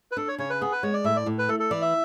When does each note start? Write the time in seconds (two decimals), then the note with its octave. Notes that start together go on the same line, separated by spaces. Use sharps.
0.11 B4
0.17 D4 A4
0.28 C#5
0.38 C#3 C#5
0.50 B4
0.61 B3 G#4
0.72 B4
0.83 G#3 C#5
0.94 D5
1.04 A2 E5
1.16 D5
1.26 A2
1.38 B4
1.49 A3 A4
1.60 A4
1.71 E3 D5
1.82 E5